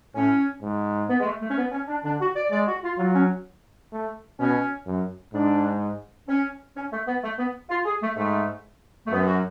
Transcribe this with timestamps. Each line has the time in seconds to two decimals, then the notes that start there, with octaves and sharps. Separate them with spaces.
0.15 A2 C#4
0.62 G#2
1.09 B3
1.20 G#3
1.25 A3
1.41 A3
1.50 C#4
1.57 B3
1.72 C#4
1.87 D4
2.04 D3 D4
2.20 F#4
2.35 D5
2.51 G#3 D5
2.67 F#4
2.83 F4
2.98 F#3 F4
3.14 C#4
3.92 A3
4.39 B2 C#4
4.86 F#2
5.34 G#2 D4
6.28 C#4
6.76 C#4
6.92 A3
7.06 B3
7.22 A3
7.38 B3
7.69 F4
7.85 G#4
8.02 A3
8.16 G#2 A3
9.06 A3
9.11 F#2 B3
9.26 F#4